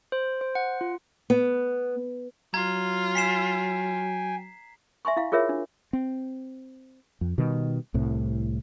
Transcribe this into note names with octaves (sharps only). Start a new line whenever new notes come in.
C5
C5
F#5
F4
B3
F#3 F4 A#5 G#6
G5 G#5 B6 C7 E7
E5 G#5 C6 C#6
E4 F5
F4 G#4 A#4 C#5 E5
D4
C4
F2
B2 D#3 G3
C2 A2 C3